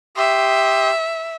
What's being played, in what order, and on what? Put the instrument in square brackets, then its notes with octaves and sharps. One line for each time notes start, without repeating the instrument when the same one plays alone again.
[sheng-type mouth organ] G4 C6 D#6 [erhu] E5